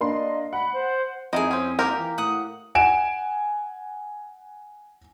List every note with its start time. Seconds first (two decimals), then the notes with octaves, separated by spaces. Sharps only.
0.01 A#3 D4 D#5 C6
0.53 F#5 B5
0.73 C5
1.33 F2 D#3 E4 G#4 D#5
1.51 C4 C#4
1.79 A#3 G4 A#4
1.99 E3
2.18 A2 F#5 D#6
2.75 F#5 G#5 D7 E7